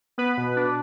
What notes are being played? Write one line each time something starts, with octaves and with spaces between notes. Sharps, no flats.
B3 B4
B2
D4